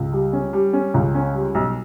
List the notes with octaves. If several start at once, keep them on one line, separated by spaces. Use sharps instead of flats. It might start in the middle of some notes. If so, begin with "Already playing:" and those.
Already playing: C#2
G3
C#4
G3
C#4
C#2
C#4
G3
B1